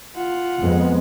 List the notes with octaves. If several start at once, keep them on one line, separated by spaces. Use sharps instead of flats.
F4 F#5
F2 G#3 B3